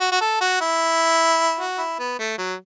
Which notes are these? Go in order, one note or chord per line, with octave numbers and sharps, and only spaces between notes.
F#4
F#4
A4
F#4
E4
F#4
E4
B3
A3
F#3